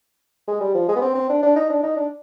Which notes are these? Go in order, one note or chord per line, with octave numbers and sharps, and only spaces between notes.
G#3
G3
F3
G#3
B3
C4
C4
D4
D4
D#4
D4
D#4
D4